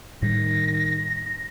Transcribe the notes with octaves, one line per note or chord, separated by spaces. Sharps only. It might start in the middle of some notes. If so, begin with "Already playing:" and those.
A2 D#3 G3 A#6